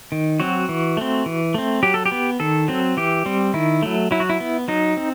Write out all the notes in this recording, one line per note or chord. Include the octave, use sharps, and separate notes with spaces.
D#3
F#3 C4 F#4
E3
A3 C4
E3
A3 C4
F#3 G4
A4
G4
B3
D#3 A4
F#3 C4
E3 G4
G3 C4
D#3 E4
F#3 A3
F#3 E4
F#4
E4
B3
F#3 D#4
C4